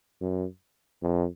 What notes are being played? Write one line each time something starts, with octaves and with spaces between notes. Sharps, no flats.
F#2
F2